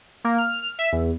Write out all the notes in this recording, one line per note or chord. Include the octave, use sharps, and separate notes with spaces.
A#3
F6
E5
E2